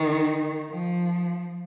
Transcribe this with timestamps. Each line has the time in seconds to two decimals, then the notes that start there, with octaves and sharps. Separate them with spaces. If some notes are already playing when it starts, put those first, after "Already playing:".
Already playing: D#3
0.71 F3